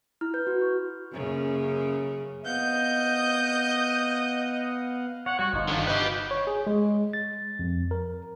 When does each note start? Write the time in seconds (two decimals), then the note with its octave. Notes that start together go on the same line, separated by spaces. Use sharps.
0.21 E4 F6
0.34 B4 G6
0.47 F#4
0.61 C#6
1.13 F#2 C#3 A#3
2.45 B3 D#5 F5 F#5 G6
5.26 C#5 F#5
5.39 G3 F#4 C#5 C#6
5.53 G1 F3 D#4 F5
5.68 D3 D#3
5.87 G4 B4 D#5 F#5 B5
6.31 C#5
6.47 G#4
6.67 G#3
7.13 A6
7.59 F2
7.91 A#4